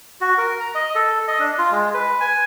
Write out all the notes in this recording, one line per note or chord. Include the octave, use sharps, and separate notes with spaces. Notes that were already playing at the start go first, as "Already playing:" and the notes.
F#4
A#4
A#5
D#5
A4
D#5
D4
F4
G#3
B4
G#5